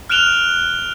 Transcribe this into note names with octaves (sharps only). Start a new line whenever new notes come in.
F6 F#6 D7 E7 F7 G7